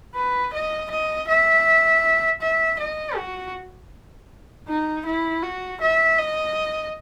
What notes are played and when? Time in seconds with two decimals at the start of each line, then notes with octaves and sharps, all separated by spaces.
0.15 B4
0.53 D#5
0.91 D#5
1.28 E5
2.42 E5
2.80 D#5
3.16 F#4
4.68 D#4
5.06 E4
5.43 F#4
5.81 E5
6.19 D#5